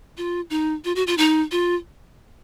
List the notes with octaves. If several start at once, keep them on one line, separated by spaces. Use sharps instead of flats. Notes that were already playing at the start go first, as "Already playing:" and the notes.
F4
D#4
F4
F#4
F4
D#4
F4